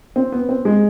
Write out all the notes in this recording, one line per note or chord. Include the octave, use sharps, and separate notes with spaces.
C4
B3
C4
G#3